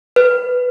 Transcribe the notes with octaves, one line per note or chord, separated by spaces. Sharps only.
B4